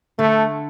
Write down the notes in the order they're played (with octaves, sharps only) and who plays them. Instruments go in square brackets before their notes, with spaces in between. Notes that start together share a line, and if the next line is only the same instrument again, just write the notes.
[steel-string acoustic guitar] D3 [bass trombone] A3